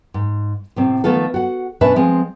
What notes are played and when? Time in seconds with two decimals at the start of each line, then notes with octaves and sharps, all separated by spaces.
0.14 G#2
0.76 A2 C3 C4
1.04 D#3 F3 A3 B3 F4 A4
1.34 F#4 F#5
1.81 B2 C#4 D4 B4 E5 A5
1.96 F3 G#3 C4